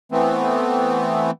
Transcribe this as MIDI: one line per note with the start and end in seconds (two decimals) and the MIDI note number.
0.12 1.31 52
0.12 1.31 57
0.12 1.31 59
0.12 1.31 60